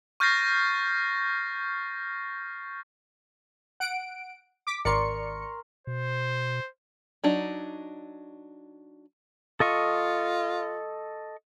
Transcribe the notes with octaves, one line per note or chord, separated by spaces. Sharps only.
C#6 F6 G6 A6 A#6 C7
F#5 D7
D6 B6
G#1 A#4 D5 C6 C#6 C#7
B2 C5
F#3 D4 D#4
F4 A4 D#5 C#6